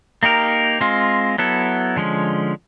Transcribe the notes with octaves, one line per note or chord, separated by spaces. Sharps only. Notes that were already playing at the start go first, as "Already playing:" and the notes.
A#3 D#4 G4 A#4
G#3 C4 F4
F#3 B3 E4 A4
D3 F3 G#3 C#4